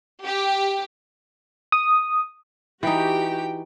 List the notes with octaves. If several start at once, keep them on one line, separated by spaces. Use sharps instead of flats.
G4
D#6
E3 D#4 F#4 G4 G5